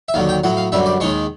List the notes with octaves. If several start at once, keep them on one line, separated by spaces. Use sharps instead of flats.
E5
D#2 D3 F#3 F5
G5
A2 F#3 F#5
F5
F#2 D3 G3 E5
D5
D#2 D#3 G#3 C#5